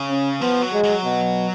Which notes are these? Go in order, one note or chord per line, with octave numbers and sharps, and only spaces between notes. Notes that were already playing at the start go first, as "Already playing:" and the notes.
Already playing: C#3
C#4
F3 B3
F#3
G#3
F#3
B2